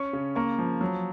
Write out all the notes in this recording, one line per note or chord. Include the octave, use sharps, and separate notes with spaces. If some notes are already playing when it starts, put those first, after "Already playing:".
Already playing: C#4 C#6
C#3
A#3 C#6
F3
F#3